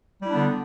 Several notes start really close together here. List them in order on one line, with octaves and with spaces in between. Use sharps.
G3 E4 D4 B3 D3